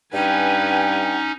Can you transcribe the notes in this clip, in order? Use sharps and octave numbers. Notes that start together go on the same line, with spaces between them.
G2 C#4 D#4 B4 G5 G#5